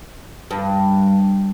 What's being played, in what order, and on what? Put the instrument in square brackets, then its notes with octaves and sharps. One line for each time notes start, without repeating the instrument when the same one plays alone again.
[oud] G2